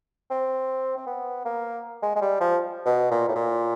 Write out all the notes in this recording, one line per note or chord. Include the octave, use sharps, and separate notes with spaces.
C4
C4
B3
A#3
G#3
G#3
G3
F3
B2
A#2
A2
A#2